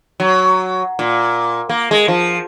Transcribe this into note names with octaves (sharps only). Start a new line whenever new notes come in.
F#3
A#2
A#3
G#3
F3